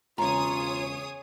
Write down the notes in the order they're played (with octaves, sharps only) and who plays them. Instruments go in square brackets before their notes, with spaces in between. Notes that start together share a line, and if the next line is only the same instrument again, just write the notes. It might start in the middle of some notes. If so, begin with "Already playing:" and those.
[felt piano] E1 C#3 [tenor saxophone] F4 [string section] G#4 C#5 D#6 [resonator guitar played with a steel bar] A#5